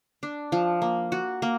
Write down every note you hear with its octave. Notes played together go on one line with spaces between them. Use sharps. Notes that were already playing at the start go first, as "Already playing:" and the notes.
D4
F3
A#3
F#4
A#3